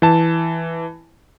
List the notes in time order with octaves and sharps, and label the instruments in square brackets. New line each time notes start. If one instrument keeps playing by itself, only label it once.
[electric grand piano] E3 A5